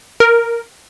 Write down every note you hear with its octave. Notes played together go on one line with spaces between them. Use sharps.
A#4